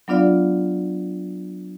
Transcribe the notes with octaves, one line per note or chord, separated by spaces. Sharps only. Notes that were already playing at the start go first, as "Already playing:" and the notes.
F#3 B3 D4 F4 D5 F5